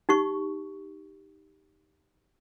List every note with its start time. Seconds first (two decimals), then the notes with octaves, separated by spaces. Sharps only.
0.09 D#4 G4 C#6